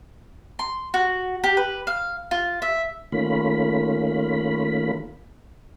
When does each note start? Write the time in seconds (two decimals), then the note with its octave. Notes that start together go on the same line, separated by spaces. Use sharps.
0.59 C6
0.94 F#4
1.44 G4
1.57 B4
1.87 F5
2.31 F4
2.62 E5
3.12 D#3 A3 A#3 C#4 F4 B5